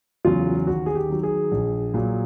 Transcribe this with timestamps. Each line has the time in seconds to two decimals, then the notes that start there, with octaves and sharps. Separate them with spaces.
0.25 E2 C#3 F#3 F4
0.67 D#2 F#4
0.86 G#4
0.95 G4
1.09 D#3 F#3
1.23 G#4
1.51 A#1
1.94 A#2 F#3